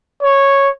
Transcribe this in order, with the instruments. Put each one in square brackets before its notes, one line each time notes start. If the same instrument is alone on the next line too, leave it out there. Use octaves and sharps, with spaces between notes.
[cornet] C#5